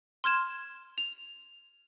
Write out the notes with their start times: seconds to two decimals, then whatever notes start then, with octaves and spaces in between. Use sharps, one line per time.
0.24 C6 F6 G#6 E7
0.98 F7